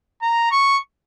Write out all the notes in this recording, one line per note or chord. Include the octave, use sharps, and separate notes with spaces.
A#5
C#6